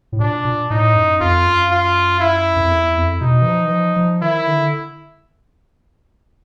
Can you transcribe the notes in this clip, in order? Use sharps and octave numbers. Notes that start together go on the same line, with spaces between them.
A2
A#2 D4
A#2
A2 D#4
F#2
F2 F4
F#2
F4
E4
F#2
F2
E2
F2
B2 D#4
E3
F3
E3
F3
F3
D#3 E4
D3